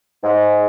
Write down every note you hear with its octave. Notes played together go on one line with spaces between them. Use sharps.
G#2